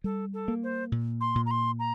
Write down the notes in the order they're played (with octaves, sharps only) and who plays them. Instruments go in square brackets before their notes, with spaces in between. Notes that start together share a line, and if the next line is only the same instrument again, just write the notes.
[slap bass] G3 [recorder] A4
[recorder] A4
[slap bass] A#3
[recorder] C5
[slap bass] A#2
[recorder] C6
[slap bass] A#2
[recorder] A#5
C6
A#5